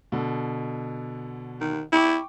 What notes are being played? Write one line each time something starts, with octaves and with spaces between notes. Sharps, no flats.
B2 D3
D#3
E4 G5 C#6 D6